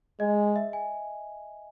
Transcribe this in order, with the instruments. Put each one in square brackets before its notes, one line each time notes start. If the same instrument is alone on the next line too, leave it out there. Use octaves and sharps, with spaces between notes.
[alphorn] G#3 [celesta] D#5
[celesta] E5
G#5